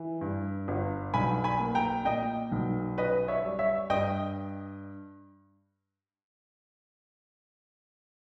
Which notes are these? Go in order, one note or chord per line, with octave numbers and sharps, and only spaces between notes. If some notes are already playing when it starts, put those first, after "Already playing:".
Already playing: E3
G2
G1
B1 G#5 B5
G#5 B5
A#3
G5 A#5
A#2 D#5 G5
B1
C#4 B4 D#5
C#5 E5
G3
C#5 E5
G2 D#5 G5